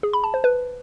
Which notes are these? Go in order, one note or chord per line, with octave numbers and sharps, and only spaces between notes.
G#4
B5
A5
C5
B4